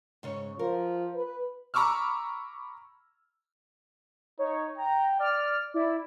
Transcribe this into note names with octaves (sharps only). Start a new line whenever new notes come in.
G#2 C#3 C#5
F3 A#4
B4
A#5 B5 C#6 D6 E6 F6
D#4 C#5
G5 A#5
D5 F6
E4 D5